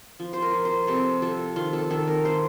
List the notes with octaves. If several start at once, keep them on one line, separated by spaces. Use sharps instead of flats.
F3
C5
A#4
F3
C5
C3 A4
F3 A4
D#3 F4
A4
D#3 A4
A#4
A#3 C5